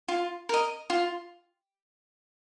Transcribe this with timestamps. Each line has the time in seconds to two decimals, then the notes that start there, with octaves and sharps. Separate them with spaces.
0.08 F4
0.49 A#4 D#5
0.90 F4